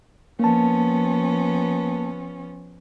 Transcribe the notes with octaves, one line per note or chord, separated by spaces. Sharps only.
F3 A#3 B3 C#4 A5